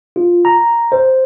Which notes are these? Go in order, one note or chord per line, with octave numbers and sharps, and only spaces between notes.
F4
A#5
C5